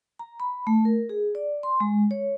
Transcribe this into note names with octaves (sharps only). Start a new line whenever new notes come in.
A#5
B5
A3
A#4
G#4
D5
C6
G#3
C#5